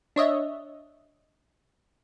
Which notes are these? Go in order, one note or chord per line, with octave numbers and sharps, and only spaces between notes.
D4 C#5 D#5 E5